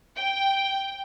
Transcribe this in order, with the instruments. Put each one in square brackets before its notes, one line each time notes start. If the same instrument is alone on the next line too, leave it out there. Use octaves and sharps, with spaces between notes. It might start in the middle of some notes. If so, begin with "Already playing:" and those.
[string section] G5